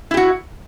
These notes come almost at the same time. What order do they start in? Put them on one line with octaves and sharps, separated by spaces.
E4 G4 F#4